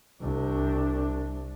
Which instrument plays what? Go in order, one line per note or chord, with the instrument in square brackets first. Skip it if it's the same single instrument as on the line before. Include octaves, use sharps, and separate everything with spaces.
[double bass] C2 D4